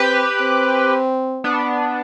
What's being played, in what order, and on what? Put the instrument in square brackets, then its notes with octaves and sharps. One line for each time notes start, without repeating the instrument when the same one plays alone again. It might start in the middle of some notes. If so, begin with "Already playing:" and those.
Already playing: [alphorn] C4 [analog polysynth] G4 B4
[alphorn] C4
[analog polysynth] B3 D4